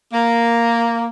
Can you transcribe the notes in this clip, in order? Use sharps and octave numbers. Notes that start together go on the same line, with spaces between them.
A#3